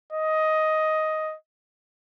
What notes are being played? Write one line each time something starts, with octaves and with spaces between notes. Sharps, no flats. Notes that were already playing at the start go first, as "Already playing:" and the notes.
D#5